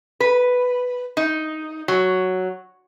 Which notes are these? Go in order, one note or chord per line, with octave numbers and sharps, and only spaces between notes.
B4
D#4
F#3